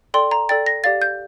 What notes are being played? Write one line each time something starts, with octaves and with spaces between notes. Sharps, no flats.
A4 D5 G5 C6
A#5
A4 D5 G5 A6
A#6
G4 D5 F5 A6
G6